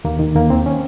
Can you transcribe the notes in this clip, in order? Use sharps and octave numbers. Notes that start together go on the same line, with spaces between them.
D#2 A#3
D#3
D#2 A#3
D#2 C4
C#4